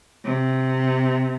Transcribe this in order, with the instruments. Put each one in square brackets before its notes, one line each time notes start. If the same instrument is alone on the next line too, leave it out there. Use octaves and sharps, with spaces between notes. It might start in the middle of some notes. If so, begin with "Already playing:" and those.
[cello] C3